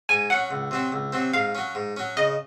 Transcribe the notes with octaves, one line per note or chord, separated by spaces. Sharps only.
G#2 G#5
F#3 C#4 F#5
C#2
C3 F#3 C4
C#2
C3 F#3 C4
G#2 F5
F#3 C#4
G#2
F#3 C#4
C#3 D#5